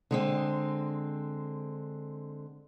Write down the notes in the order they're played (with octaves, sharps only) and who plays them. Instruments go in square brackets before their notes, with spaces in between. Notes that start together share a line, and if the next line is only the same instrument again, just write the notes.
[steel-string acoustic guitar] D3 G#3 C4